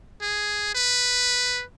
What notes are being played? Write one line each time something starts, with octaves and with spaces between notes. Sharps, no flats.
G#4
B4